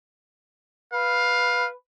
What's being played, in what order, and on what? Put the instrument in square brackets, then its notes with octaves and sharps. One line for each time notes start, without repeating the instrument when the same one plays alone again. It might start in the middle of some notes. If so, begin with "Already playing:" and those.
[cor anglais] B4 [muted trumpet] F5